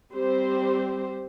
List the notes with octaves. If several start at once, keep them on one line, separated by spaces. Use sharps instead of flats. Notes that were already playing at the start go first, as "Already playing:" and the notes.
G3 C4 G4 C5